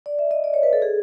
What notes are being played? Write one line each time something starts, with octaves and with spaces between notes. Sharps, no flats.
D5
E5
D#5
D5
C#5
B4
A4
G#4